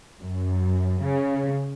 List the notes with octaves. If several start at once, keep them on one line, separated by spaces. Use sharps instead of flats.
F#2
C#3